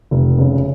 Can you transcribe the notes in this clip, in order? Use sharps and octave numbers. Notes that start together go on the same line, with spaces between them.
F1
C#3